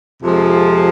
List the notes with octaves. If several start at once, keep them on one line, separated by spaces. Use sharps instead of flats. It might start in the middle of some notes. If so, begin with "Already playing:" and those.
F2 C3 F3 G#3